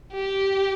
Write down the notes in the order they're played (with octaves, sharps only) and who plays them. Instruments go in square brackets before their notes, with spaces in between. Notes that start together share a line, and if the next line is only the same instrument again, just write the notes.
[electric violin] G4